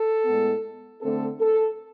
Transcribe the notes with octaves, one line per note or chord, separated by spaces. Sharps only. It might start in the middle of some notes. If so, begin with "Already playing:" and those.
Already playing: A4
A2 G#3 B3
D3 A3 C4 A4
A4